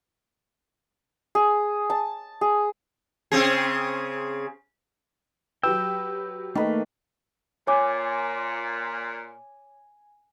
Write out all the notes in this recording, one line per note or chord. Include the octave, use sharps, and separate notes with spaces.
G#4
A5
G#4
C#3 C4 G#4
F#3 G4 B4 G5 E6
D#3 A3 A#3 B4 D#5
A#2 C#5 G#5 D6